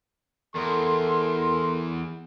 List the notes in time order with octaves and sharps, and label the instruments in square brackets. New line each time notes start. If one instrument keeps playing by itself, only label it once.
[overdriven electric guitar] E2 [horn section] A4 A#4 C6